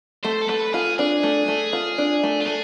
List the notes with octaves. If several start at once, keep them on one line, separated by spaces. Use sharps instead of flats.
A3 C5
A4
A3 B4
F4 G#4
D4 G#4
A3
A3
F4
D4
A3
F4
A3 G#4